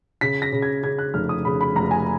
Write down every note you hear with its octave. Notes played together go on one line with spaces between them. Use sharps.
C#3 B6
A#6
C#3
G#6
C#3 G#6
F#6
F1 F6
D#6
C#3 B5
B5
F1 A#5
G#5